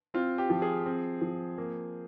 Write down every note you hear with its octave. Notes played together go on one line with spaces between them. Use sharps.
C4 F4
G4
F3
G#4
C4
F3
A#3